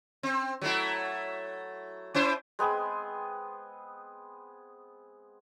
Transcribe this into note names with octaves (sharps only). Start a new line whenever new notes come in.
C4
F#3 A3 E4
C#4 E4 C5
G#3 B3 C4 G#4